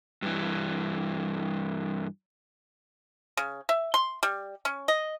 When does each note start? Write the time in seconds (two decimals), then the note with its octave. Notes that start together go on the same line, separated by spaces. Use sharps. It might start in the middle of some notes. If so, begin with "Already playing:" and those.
0.22 G2 E3
3.37 C#3
3.69 E5
3.94 C6
4.23 G3
4.65 C#4
4.88 D#5